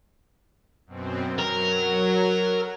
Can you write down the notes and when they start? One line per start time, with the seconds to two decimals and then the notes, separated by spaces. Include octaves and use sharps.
0.87 F#2 B2 C4
1.39 F#3 A#4